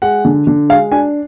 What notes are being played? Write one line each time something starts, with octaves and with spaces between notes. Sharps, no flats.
G#3 F#5
D3
D3
G#3 F5
D4 G#5